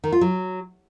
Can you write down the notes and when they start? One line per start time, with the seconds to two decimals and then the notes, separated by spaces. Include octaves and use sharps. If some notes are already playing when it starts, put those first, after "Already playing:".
0.04 D#3
0.12 F4
0.21 F#3